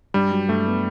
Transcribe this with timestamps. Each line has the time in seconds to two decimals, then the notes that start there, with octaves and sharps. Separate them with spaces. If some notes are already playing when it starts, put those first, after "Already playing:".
0.14 G2 G3
0.31 F#3
0.48 G2 A3
0.66 B3